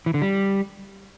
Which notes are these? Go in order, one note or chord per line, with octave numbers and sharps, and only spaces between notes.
E3
D3
G3